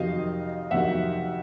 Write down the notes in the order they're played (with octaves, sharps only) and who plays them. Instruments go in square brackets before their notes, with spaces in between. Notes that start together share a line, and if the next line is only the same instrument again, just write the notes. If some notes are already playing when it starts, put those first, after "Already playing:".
Already playing: [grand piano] F2 C3 D#3 F#3 D#5 F5
F2 C3 D#3 F#3 E5 F#5